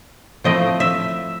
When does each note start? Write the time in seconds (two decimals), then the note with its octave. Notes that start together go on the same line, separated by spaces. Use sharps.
0.44 F3 A3 C4 E4 D#5
0.80 E5